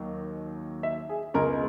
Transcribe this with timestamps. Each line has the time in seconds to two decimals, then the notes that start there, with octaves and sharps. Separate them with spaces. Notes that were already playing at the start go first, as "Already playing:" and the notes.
Already playing: D#2 D#3 F#3
0.83 E5
1.09 G#4
1.34 C#2 B2 G#3 A#4